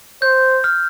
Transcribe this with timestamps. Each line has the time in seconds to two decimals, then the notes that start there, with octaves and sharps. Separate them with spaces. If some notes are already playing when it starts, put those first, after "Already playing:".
0.22 C5 G6
0.64 F6